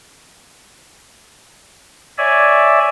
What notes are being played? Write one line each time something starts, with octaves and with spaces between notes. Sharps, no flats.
C#5 D5 E5 G#5